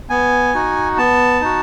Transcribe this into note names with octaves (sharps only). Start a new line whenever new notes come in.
B3 G#5
D#4 F#4
B3 A5
D#4 F#4